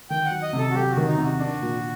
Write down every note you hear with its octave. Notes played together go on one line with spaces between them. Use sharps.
D#3 G5
F#5
F#3
D#5
C3 A4
F#4
F#3 G4
F#4
D#3
D#4
C3
F#4
D4
A#2